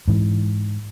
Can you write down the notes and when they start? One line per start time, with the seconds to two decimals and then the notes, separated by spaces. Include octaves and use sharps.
0.08 G#2 E3